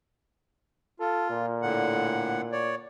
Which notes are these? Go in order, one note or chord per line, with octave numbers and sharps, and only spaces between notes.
F4 A4
A#2
A2 D3 F#5
C#5 D5